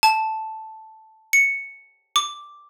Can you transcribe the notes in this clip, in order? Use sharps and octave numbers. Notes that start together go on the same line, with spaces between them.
A5
C#7
D6